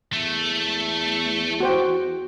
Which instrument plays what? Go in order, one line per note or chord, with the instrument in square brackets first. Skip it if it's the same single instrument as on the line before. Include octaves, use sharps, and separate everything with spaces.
[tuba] E2 [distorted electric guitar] A3
[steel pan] F#4 C5 G5